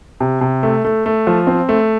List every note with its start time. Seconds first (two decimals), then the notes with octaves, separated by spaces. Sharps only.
0.21 C3
0.41 C3
0.63 A3
0.85 A3
1.06 A3
1.27 F3
1.47 C4
1.69 A3